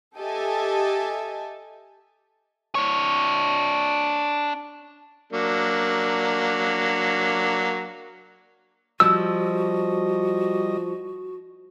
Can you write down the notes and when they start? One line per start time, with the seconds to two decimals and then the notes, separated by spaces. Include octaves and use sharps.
0.17 G4 A4 D#5 E5 G#5 A5
2.75 D4 C#5
5.33 F#3 A#3 D4
9.00 F3 G3 F#4 D#5 E6